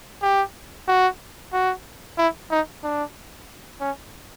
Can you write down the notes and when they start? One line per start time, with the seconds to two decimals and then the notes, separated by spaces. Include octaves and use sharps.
0.22 G4
0.88 F#4
1.53 F#4
2.18 E4
2.50 D#4
2.84 D4
3.81 C#4